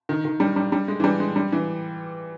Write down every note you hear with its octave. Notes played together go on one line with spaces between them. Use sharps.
D#3
D#3
G3
G3
G3
G#3
E3
G3
G#3
G3
E3